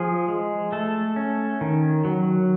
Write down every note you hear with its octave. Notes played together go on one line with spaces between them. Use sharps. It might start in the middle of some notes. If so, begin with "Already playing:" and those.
Already playing: F3 G#4
G#3
A3 A4
C#4
D#3
F#3